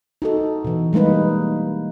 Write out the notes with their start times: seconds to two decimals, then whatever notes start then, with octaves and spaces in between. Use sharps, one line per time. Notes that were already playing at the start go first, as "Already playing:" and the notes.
0.22 D#4 F#4 A4
0.64 B2 E3
0.93 G3 G#3 A#3 D#4 B4